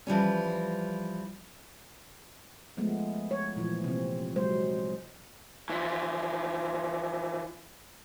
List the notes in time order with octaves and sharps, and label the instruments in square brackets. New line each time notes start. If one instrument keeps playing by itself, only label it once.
[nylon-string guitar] E3 F3 G3 C#4
[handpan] F3 G#3 A3 B3
C#5
A#2 E3 F3
C3 C4
F#3 G#3 C5
[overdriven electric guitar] E3 F3